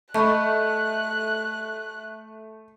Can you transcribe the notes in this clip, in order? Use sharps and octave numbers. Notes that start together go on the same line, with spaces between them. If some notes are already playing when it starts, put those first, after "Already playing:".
A3 D#5 B5 C#6 F#6